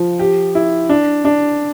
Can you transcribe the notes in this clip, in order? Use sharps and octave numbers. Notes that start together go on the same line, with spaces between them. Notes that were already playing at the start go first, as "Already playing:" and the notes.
Already playing: F3
G4
E4
D4
D4